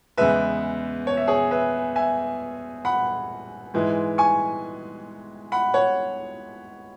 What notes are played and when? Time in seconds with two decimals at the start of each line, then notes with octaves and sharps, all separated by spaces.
0.18 E2 C#3 G#3 B3 B4 E5
1.07 C#5
1.17 E5
1.28 G#4 C#5
1.51 B4 E5
1.96 E5 G#5
2.85 F#5 B5
3.74 G#2 E3 G#3
4.18 G#5 C#6
5.52 F#5 B5
5.74 C#5 F#5